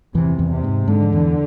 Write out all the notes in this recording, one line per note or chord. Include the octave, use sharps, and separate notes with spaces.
E2 C3 E3
E2 E3
C3
G#2 G#3
G#2 D3 G#3
F3
E2 E3